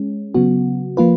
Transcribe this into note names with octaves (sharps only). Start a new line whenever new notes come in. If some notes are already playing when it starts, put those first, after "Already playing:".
Already playing: G#3 C#4
C#3 F#3 B3 F#4
F3 A#3 F4 B4